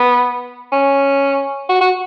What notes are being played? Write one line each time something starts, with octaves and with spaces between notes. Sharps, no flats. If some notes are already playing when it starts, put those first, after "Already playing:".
Already playing: B3
C#4
F#4
F#4